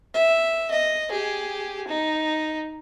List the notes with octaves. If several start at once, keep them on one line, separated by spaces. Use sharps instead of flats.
E5
D#5
G4 G#4
D#4